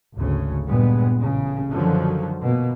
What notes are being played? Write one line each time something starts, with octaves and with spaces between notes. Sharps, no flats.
G#1 D2 C#3
G2 A#2 G#3 B3
A1 C#3
F#2 D3 D#3 F3 F#3
B2 A#3